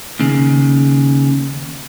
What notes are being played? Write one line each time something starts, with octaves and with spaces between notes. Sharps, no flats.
D#2 C#3